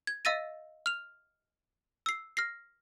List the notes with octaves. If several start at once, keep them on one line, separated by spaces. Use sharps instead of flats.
G#6
D#5 F5 E6 A6 A#6 D#7
F6 F7
E6 C7
F6 A#6 C7